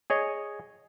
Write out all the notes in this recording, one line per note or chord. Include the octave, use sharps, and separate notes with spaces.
G#4 C#5 D#5